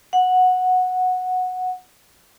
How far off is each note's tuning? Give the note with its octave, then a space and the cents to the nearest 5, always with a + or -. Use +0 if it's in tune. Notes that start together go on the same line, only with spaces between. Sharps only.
F#5 -10